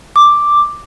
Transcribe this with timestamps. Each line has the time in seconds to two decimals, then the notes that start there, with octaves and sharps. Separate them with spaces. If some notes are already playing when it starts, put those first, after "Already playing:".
0.16 D6